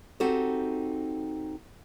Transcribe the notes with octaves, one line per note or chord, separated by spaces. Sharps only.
C4 D#4 F#4 G4 A4